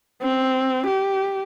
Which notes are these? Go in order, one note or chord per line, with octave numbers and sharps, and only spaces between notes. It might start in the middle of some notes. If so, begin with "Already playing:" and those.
C4
G4